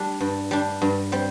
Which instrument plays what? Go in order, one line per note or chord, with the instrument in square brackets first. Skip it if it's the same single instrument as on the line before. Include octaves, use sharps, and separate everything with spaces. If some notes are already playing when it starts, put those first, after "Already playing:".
Already playing: [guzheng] G3 D4
G2
G3 D4
G2
G3 C4